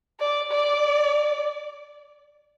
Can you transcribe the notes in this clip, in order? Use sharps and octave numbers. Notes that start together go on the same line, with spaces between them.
D5
D5